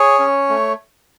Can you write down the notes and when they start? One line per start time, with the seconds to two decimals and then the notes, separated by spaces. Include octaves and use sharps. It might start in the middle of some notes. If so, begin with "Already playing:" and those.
Already playing: G#4 C#5
0.19 C#4
0.49 A3